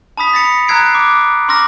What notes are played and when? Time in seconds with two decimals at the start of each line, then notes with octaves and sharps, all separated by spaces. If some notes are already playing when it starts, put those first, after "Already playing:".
0.17 A5 B5 D#6 B6
0.33 A6 A#6 C#7 F7
0.68 A#5 E6 F#6 G#6 C7 D7
0.95 D6
1.48 A#5 C6 D6 E6 F6 A#6